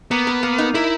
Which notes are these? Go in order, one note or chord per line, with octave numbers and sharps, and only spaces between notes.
A#3 B3
A#4
A#3
D#4
E4 A#4